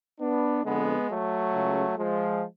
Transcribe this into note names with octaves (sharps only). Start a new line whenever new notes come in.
B3 D4
F2 D3 G#3 B3
F#3 A3
C#2 C#3
F3 G#3